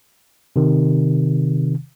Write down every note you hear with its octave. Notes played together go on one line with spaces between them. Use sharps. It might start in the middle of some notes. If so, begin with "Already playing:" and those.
C3 D#3